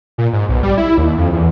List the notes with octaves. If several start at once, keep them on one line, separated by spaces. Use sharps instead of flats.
A#2
G#2
B1
G3
E4
D#2
F2
E2